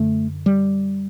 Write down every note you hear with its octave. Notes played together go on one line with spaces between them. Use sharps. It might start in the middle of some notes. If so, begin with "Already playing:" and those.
Already playing: F#2 D3 A3
G3